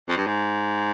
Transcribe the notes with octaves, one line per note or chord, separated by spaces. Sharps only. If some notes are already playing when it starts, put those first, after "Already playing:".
F2
G2
G#2